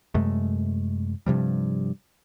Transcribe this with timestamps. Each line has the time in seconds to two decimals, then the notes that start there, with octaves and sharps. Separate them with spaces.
0.14 F#2 C3 G#3 A3
1.26 G2 C3 F3 G3